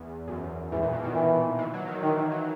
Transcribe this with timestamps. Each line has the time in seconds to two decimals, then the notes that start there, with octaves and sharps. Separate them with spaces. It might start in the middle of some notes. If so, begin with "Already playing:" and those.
Already playing: E2
0.28 F#2
0.72 G#2 E3
0.83 A#2
0.93 B2
1.04 D#3
1.15 E3
1.59 E3
1.74 F#3
1.88 D#3
2.02 D#3 E3
2.17 E3
2.32 F#3